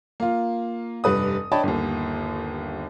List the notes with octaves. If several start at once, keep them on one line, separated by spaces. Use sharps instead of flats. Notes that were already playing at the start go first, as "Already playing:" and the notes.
A#3 F4
F1 G2 B4 D#6
D4 C#5 D#5 G5 A5 B5
G1 D#2